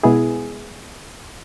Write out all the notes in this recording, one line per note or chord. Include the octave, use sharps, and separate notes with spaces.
B2 G#3 B3 E4 G#4